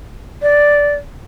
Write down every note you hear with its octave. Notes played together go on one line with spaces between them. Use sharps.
D5